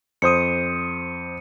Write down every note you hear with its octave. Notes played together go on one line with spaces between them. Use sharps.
F2 C5 D#6 C#7 D#7